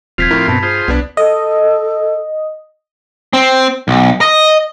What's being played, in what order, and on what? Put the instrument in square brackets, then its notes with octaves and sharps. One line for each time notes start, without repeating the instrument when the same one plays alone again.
[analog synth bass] E1 [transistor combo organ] F3 C4 F4 [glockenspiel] G#6 B6 F7
[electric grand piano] A2 A#4 [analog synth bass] E4
[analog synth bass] G2 [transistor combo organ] B2 C4 [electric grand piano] A5 B5
[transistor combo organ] F4 G#4 C5
[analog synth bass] C2 [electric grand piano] B3 D4
[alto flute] A4 [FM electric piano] D#5
[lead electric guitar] C4
B1
D#5